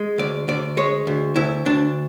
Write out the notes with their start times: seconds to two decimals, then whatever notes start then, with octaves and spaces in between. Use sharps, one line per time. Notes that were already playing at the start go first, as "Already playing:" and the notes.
Already playing: G#3
0.18 D2 D5
0.48 D2 D5
0.77 G#3 C#5
1.07 D2
1.36 D2 E4
1.66 D2 D4